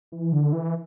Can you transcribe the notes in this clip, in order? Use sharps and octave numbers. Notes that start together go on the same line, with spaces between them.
E3
D3
E3